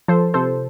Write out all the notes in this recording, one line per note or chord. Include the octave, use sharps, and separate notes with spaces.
F3 A4 C5
C3 A4 C5